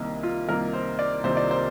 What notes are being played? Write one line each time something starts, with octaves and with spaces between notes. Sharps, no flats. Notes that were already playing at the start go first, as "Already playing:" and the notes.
Already playing: C2 C3 D#3 A#3
F4
C2 C3 D#3 A#3 A#4
C5
D5
C2 C3 D#3 A#3 C5
D5
C5